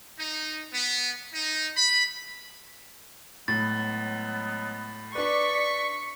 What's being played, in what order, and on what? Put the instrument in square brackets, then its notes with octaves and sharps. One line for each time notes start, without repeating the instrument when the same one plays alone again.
[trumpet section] D#4
B3
D#4
B5
[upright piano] A2 [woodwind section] F#3 G#3 B3 [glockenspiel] A6
[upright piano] D4 B4 [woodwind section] D5 [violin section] C#6 B6